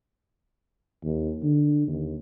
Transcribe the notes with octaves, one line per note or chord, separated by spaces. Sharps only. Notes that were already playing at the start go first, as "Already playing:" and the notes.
D#2
D3
D#2